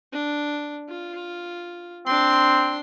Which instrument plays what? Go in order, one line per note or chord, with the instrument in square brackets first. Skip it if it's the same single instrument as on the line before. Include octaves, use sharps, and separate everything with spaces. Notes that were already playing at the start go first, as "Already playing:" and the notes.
[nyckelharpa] D4
F4
[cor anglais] C4 [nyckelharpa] D4 C6